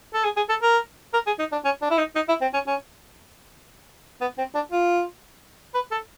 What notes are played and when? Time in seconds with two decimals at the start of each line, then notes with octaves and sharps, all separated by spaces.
0.14 A4
0.24 G#4
0.37 G#4
0.49 A4
0.62 A#4
1.13 A#4
1.27 G#4
1.39 D#4
1.52 D4
1.65 C#4
1.82 D4
1.90 E4
1.98 D#4
2.16 D#4
2.28 E4
2.42 C4
2.54 C#4
2.67 C#4
4.21 B3
4.38 C4
4.55 D4
4.72 F4
5.74 B4
5.92 A4